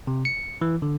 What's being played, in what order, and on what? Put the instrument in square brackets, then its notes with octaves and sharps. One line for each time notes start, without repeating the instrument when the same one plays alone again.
[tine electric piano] C3
C#7
E3
D3